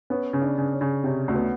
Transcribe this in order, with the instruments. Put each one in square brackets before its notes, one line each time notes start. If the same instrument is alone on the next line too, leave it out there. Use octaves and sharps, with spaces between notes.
[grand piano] B3 [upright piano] C#4
[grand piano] C#3
[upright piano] D4
[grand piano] C#3
[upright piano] C#4
[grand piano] C#3
[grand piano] C3 [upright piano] C#4
[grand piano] D2
[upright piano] B3